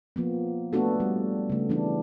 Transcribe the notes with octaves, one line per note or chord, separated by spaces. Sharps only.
F3 A#3 B3
A3 B3 D4 F#4 A4
G3
C#3 A3
E3 B3 D4